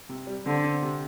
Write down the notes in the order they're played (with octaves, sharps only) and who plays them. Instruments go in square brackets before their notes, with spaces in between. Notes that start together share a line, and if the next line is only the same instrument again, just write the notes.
[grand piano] C3
G3
[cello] D3 [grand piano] C4
[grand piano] C4
C3